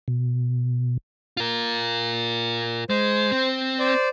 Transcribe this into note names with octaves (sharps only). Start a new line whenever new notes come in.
B2
F4 A#4
G#3 C5
C4
C5 D5